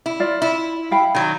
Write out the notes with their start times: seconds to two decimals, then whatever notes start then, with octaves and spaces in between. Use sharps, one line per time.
0.06 E4
0.20 F4 D5
0.42 E4
0.91 F5 G5 B5
1.15 D#3 F#3